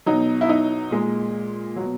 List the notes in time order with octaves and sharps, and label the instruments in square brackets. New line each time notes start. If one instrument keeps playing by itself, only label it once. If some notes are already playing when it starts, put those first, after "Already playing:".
[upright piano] B2 F#3 D#4
E4
D#4
A#2 G#3
B2 F#3